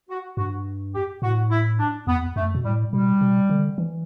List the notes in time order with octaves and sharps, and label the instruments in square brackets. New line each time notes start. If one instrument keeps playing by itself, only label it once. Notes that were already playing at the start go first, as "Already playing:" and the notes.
[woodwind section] F#4
[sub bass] G2 [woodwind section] F#4
[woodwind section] G4
[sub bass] A2 [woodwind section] F#4
[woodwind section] E4
D4
[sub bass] E2 [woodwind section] B3
[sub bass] F#2 [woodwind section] A3
[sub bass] B2
[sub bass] A2 [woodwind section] G3
[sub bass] B2 [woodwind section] G3
[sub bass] B2
D3
E3